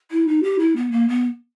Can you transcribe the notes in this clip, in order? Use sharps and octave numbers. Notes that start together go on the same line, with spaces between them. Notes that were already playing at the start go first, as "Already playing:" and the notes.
E4
D#4
G4
E4
B3
A#3
B3